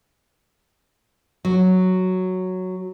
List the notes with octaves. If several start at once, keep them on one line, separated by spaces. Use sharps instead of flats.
F#3